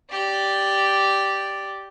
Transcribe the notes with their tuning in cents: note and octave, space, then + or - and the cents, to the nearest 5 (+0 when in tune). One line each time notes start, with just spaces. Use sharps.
G4 -5 D5 +0